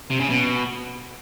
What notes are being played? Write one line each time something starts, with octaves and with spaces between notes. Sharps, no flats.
C3
C#3
B2